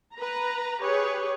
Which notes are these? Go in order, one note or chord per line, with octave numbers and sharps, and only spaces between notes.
B4 A#5
G4 G#4 B4 C#5